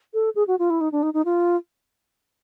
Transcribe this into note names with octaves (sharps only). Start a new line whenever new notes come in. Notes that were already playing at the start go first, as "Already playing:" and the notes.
A4
G#4
F#4
F4
E4
D#4
D4
D#4
D#4
F4